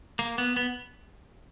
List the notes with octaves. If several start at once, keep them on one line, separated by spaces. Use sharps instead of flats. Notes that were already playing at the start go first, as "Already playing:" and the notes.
A#3
B3
B3